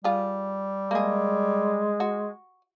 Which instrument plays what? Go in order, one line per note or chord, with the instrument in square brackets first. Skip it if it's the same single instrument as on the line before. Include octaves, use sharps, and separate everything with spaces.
[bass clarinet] G3 [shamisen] F4 G#4
[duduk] G#3 [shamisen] A#3 G#4
[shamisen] F#4